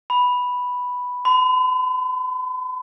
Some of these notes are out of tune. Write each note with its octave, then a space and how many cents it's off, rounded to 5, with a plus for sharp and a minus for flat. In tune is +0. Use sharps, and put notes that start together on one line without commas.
B5 +0
B5 +45